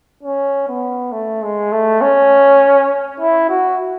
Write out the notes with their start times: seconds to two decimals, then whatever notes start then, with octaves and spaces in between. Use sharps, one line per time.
0.23 C#4
0.68 B3
1.12 A3
1.43 G#3
1.72 A3
2.01 C#4
3.20 E4
3.49 F#4